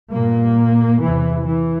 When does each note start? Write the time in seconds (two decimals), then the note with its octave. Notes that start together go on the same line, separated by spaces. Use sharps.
0.13 G2 A#2 A#3
1.02 E2 C3 E3
1.47 E3